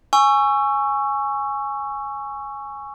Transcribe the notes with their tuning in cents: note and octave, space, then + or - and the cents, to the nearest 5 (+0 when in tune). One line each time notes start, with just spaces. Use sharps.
G#5 +0 C#6 +0 E6 +20